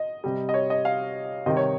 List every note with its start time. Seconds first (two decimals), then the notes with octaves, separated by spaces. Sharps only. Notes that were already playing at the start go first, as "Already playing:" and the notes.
Already playing: D#5
0.24 C3 G3
0.49 D#5
0.54 C#5
0.70 D#5
0.85 F5
1.46 C3 D#3 G3 D#5
1.57 C#5